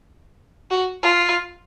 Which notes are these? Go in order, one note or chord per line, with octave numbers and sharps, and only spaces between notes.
F#4
F4